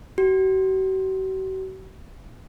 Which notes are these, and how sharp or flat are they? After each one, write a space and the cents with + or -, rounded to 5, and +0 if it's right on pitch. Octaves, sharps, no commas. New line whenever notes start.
F#4 +45